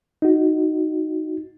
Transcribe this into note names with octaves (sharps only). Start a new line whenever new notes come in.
D#4 F#4